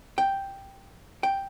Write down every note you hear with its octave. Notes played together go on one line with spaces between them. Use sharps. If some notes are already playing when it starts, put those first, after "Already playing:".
G5
G5